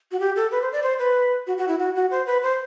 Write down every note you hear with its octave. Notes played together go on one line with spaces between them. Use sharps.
F#4
G4
A4
B4
C5
D5
C5
B4
F#4
F#4
E4
F#4
F#4
C5
B4
C5